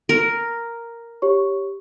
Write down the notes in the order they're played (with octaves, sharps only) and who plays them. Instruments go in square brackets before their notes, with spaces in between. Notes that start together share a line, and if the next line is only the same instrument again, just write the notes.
[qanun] A#4
[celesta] G4 C#5 C#6